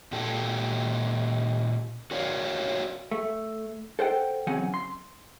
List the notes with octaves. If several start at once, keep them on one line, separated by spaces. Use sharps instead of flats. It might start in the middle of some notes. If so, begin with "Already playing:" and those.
A#2 G4 A4
F#4 A#4 C#5 D5 F5
A3
A4 C5 F#5 G5
E2 C#3 F#3 C4 F#5 G#5
C6